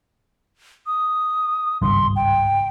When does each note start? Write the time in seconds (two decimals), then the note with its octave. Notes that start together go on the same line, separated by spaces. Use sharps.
0.87 D#6
1.82 G#1 C#2 G2 C6
2.16 G5